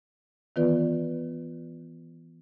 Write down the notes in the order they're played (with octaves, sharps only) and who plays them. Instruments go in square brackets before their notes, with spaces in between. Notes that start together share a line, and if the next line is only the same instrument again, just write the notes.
[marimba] D#3 E3 B3 F4 B4 D5